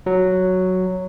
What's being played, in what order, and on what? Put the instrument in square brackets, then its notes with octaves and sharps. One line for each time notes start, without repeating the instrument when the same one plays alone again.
[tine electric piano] F#3